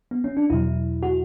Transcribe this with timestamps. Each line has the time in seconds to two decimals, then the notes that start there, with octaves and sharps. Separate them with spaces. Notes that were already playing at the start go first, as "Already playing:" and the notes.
0.11 B3
0.24 C#4
0.37 D4
0.50 E2 B2 F#3 E4
1.03 F#4